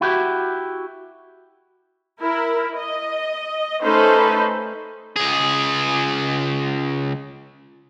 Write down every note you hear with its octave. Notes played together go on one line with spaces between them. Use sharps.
E4 F#4 G4
E4 A#4
D#5
A3 C#4 D#4 A4 B4 C5
C#2 G#4